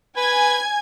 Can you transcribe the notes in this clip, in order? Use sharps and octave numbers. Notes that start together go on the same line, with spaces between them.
B4 G#5 G#6